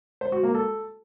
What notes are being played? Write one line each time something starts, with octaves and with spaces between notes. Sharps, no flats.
C5
F#4
A#3
A4